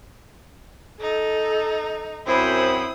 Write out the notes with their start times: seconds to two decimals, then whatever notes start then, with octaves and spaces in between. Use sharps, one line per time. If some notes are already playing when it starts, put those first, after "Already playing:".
1.01 D#4 A4
2.27 F#2 C4 E4 C5 B5 D#6